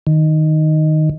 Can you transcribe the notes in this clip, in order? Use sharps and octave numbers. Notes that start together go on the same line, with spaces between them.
D#3